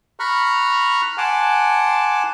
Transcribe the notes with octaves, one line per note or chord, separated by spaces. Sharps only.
A#5 B5 C#6 F6 F#6
F#5 G#5 A5 C6 D6